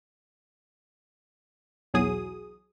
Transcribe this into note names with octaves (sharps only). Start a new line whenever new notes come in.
B1 E2 F#3 G#4 D#6